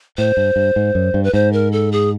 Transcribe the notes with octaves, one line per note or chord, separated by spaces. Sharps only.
A2 C5
G2
G2
G#2
F#2
G2
B4
G#2 C5
A#4
A4
G#4